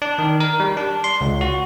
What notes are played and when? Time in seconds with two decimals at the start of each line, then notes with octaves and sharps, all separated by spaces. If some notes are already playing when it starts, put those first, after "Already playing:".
0.02 D4
0.18 D#3
0.40 A#4
0.60 G3
0.77 D4
1.04 C6
1.21 C#2
1.41 F#4